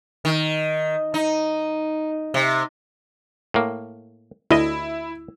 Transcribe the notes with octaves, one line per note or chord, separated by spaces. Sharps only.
D#3
D#4
C3
A2 A#3
D2 E4 D#5